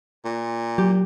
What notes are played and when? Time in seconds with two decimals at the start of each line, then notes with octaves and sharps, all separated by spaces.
0.24 A#2
0.78 F#3 G4